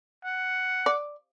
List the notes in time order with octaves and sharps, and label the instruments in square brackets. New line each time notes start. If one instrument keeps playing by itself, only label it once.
[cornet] F#5
[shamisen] D5